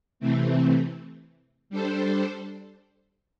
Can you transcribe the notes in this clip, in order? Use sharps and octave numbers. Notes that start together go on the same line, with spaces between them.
C3 E3 A3 C4
G3 D4 A4 C5